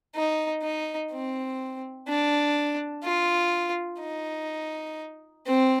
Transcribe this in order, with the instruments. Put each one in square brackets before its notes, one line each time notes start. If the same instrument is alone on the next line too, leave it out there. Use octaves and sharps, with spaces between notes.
[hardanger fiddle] D#4
D#4
C4
D4
F4
D#4
C4